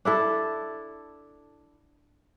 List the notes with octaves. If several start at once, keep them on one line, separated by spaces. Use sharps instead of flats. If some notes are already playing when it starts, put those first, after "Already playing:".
D4 E4 A4